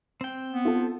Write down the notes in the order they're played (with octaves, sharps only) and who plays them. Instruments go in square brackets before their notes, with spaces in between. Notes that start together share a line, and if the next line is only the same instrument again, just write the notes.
[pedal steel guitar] C4 G5
[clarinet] B3
[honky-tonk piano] F4 A4